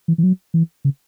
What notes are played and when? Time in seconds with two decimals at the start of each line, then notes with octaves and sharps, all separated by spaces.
0.08 E3
0.18 E3
0.23 F#3
0.54 E3
0.85 C#3